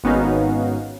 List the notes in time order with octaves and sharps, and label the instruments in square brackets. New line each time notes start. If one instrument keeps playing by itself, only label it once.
[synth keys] G#1 B3 C#4 D#4 F#4 F5